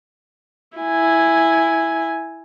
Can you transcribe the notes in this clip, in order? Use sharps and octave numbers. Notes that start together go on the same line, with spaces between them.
E4 G#5